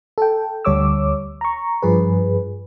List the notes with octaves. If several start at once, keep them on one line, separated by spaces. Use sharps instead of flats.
A4 G5
D2 G3 C#5 D6 E6
A#5 C#6
G2 F3 G#4 B4